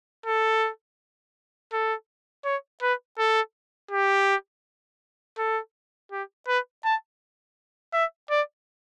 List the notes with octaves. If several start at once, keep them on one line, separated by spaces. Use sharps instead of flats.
A4
A4
C#5
B4
A4
G4
A4
G4
B4
A5
E5
D5